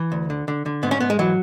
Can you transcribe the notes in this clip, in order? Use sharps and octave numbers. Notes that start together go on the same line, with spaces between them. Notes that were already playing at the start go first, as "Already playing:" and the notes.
Already playing: E3
D2
D3
D3
D3
G#2 B3
C#4
G#2 B3
G#3
E3 F#3